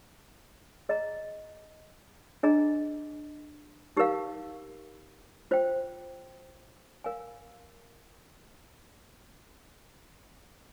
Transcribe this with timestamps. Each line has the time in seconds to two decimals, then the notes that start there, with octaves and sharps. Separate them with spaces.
0.89 G#4 D#5 A#5
2.43 D4 G#4 D#5 A#5
3.97 D#4 G4 A#4 F5
5.51 F4 C5 G5
7.04 A#4 F5 G#5